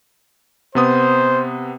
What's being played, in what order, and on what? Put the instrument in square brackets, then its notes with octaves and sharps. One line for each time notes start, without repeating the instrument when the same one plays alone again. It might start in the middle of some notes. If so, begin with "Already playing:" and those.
[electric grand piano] C3 B3 D#6 [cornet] C5